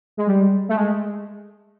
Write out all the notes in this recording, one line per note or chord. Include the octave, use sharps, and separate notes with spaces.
G#3
G3
A3
G#3